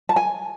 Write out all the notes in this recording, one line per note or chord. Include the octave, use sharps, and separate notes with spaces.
A5
G#5